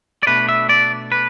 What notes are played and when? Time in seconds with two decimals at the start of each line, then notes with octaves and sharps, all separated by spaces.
0.23 D5
0.27 B2 A3 D4 B4
0.49 E5
0.69 D5
1.12 B4